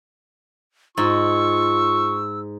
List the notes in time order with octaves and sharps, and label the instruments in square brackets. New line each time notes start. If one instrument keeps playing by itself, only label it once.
[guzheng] G#2 [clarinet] F4 [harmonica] C#6 [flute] E6